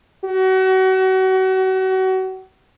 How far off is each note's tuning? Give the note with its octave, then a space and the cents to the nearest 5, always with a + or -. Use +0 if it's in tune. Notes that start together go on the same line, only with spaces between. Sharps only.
F#4 +35